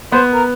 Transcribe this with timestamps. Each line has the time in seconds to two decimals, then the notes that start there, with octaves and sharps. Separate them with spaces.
0.12 B3 C5
0.33 A#4